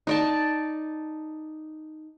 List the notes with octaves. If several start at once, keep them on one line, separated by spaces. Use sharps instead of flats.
D#4 D5 A5